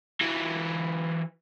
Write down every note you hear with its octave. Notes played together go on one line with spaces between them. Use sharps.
E3 F#3